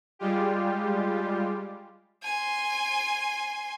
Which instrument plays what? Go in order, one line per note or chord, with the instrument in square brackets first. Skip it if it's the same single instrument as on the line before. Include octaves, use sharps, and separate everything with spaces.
[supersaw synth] G3 G#3 F4 G4
[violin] G#5 C6